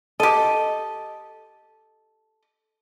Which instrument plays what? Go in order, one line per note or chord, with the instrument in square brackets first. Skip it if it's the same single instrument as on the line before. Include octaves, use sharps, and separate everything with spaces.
[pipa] G4 D#5 [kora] A4